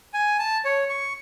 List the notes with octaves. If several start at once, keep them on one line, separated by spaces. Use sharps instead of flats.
G#5
A5
C#5
C#6